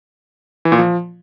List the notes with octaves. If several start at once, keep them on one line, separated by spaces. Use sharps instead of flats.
E3
A#2
F3